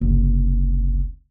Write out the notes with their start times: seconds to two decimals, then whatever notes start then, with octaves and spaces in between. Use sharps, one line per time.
0.01 F#1 C2